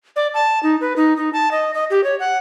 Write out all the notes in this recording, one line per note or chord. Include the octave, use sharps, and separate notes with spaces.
D5
A5
D#4
B4
D#4
D#4
A5
D#5
D#5
G4
C#5
F#5